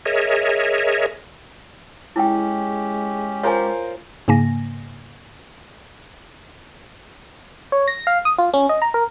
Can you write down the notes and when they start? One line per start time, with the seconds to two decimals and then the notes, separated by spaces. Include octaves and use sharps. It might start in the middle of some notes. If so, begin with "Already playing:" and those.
0.05 G#4 A#4 C#5 D#5 E5
2.16 G#3 C#4 E4 G4 G5
3.43 F4 A#4 C5 C#5 G#5
4.28 G#2 C#3 A#3 G#5 A#6
7.72 C#5
7.88 A#6
8.07 F5
8.25 D#6
8.38 F4
8.54 C#4
8.69 D#5
8.82 A#5
8.94 A#4